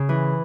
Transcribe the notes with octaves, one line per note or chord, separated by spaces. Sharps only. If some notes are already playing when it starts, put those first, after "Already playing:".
Already playing: C#3
E3